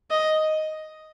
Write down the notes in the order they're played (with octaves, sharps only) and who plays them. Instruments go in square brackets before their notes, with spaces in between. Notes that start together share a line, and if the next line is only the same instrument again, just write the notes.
[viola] D#5